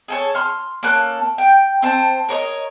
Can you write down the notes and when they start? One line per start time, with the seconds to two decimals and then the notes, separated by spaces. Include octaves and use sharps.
0.08 G#4 A4 C#5
0.35 C6 F6
0.83 A#3 C#4 A4 F#6
1.38 G5
1.82 C4 C5 A5
2.29 A#4 C#5 D#5